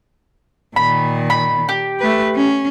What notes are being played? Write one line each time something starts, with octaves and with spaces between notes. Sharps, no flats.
A#2 D#3 B5
B5
G4
A3 B4
C#4